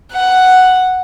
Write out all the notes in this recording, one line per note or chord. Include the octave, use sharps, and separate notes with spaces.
F#5